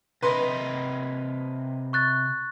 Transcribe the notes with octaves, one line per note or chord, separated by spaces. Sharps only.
C3 A#4 B4 D#5 C6
C#6 F#6 A6